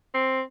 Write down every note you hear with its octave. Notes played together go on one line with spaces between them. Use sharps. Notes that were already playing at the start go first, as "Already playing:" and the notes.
C4